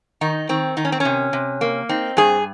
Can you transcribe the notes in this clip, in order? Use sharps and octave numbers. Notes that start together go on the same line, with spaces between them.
D#3 D#4
D#3 C4
D#3 D#4
C#4
C4
C#4
C3
C3
A#3
C4 D#4
G2 G#4